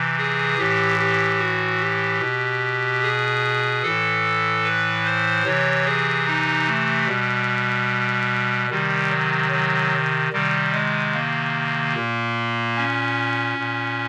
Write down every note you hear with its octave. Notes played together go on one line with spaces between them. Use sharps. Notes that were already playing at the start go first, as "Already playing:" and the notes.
Already playing: C3 E3
G#4
A2 E3 G4
G4
F#4
G4
B2
G#4
A2 E3 A4
B4
C5
C3 E3 C#5
G#4
D#4
A3
B2 G3
C3 D#3 G3
F#3
F#3
C3 D#3 G3
G#3
A#3
A#2
C#4
A#2